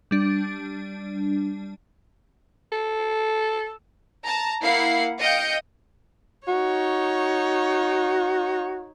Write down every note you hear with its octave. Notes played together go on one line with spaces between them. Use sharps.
G3 D4
A4
A5 A#5
A#3 E4 F5 F#5 C7
D#5 F5 G5 G6 C#7
D#4 F#4 C#5